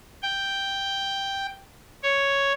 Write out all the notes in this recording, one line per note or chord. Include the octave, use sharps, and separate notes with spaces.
G5
C#5